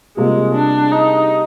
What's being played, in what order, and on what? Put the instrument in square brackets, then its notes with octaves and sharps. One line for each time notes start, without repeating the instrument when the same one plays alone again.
[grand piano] C3 G3 A#3 F4 G#4 [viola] G#3
[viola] D4
D#4